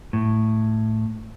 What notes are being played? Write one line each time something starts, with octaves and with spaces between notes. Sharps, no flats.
A2